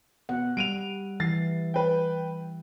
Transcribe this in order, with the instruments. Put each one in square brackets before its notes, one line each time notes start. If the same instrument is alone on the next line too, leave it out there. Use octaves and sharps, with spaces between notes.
[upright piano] B2 [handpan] F#5
[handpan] G3 [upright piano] D7 D#7 F7
[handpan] E3 [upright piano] A6 C7
[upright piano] B4 G5